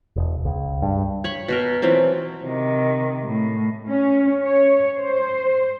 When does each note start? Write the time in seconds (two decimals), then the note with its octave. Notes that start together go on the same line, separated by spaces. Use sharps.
0.16 E1
0.45 C#2
0.82 G2
1.24 C#5 B5 C#6
1.48 B2 F#4 A#4
1.82 E3 F#3 C4 F4
2.43 C3 D#3
3.24 A2
3.88 C#4
4.43 C#5
4.98 C5